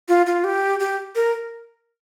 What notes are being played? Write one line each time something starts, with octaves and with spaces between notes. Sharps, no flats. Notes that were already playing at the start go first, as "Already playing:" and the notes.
F4
F4
G4
G4
A#4